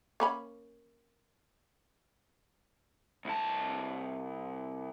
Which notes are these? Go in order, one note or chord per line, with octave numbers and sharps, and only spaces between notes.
A#3 C#4 B5
C2 A5